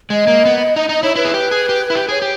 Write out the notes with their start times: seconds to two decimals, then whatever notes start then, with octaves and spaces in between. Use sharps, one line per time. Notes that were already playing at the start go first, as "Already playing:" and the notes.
0.10 G#3 D#5
0.27 A#3
0.45 B3
0.76 D#4
0.89 D#4 D#5
1.03 E4 C#5
1.16 E4 B4
1.25 G#4
1.34 G4
1.51 G#4
1.69 G4
1.90 E4
1.95 G4
2.09 G#4 C#5
2.22 G4